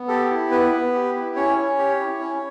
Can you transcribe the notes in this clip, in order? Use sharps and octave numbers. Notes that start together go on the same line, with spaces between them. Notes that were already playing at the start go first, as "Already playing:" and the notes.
Already playing: B3
G4 A4
E4
B3 B4
B3
G4
E4
C#4 C#5
C#4
G4
E4
C#4